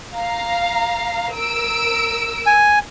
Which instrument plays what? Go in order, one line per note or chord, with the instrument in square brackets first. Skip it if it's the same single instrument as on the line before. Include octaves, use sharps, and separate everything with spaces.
[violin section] F5 A#5
A#4 E6 D7
[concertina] G#5